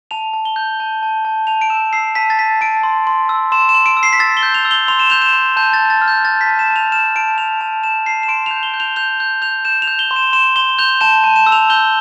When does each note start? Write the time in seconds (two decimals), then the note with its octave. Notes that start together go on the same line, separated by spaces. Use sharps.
0.11 A5 F7
0.34 A5
0.45 G7
0.56 G6
0.80 A5
1.03 A5
1.25 A5
1.47 A5 F7
1.61 D7
1.70 E6 E7
1.93 E6 C7
2.15 A5 B6
2.30 A6
2.39 A5 B6
2.61 A5 D7
2.83 C6
3.07 C6
3.29 E6
3.52 C6 E7
3.69 E7
3.74 C6
3.86 D7
3.97 E6
4.03 C7
4.13 B6
4.19 E6 A6
4.37 G7
4.43 G6
4.54 F7
4.65 E6
4.71 G7
4.88 C6 F7
4.99 E7
5.10 G6 F7
5.22 E7
5.33 C6
5.56 A5 G6
5.73 A6
5.79 A5
5.90 A6
6.01 F6
6.08 G6
6.25 A5 A6
6.41 B6
6.47 A5
6.59 E7
6.70 A5
6.76 F7
6.92 F6 E7
7.16 A5 D7
7.38 A5 F7
7.61 A5 F7
7.83 A5 E7
8.06 A5 C7
8.23 E7
8.28 C6 D7
8.46 G6 F7
8.63 G7
8.74 G6
8.80 F7
8.96 G6 F7
9.20 G6
9.42 G6 F7
9.65 G6 E7
9.82 F7
9.88 G6
9.99 G7
10.11 C6
10.16 E7
10.33 C6 E7
10.56 C6 G7
10.79 G6 F7
11.01 A5 E7
11.24 A5
11.36 E7
11.46 E6
11.52 F7
11.70 G6 G7